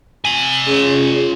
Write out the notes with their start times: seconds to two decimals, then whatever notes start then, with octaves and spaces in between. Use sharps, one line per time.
0.25 F4 G#5
0.67 C#4 G#4